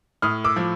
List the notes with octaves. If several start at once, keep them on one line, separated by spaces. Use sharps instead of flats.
A2 D#6 F6
D6 E6
F3